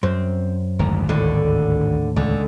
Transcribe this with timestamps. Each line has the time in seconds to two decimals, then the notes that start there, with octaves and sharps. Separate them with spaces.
0.03 F#2 C4
0.79 G#1 D2 A#4
1.09 D#2 A2 D3
2.16 C#2 D3